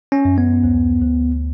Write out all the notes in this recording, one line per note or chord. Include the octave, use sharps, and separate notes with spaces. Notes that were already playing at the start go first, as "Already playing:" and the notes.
C#4
F#2
B3
D2
D2